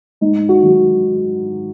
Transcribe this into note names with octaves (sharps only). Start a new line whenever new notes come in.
G#2 D#4
F#4
D#3 F#3